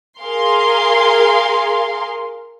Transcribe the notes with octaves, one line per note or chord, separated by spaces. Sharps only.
G#4 A#4 F5 C6